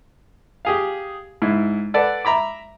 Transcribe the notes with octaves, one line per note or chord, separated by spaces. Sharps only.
G4 G#4 F5
G#2 E4
A4 B4 D5 F#5 A5
E5 A#5 B5 D6